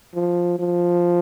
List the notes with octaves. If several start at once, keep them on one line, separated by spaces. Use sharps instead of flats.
F3
F3